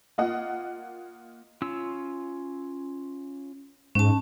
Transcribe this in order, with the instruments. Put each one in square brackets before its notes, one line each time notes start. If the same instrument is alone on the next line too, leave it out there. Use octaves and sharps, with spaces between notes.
[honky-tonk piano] A#3 F4 D#5 F#5
[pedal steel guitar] C#4 F4 E6
[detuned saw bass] G#2 [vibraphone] C#4 A5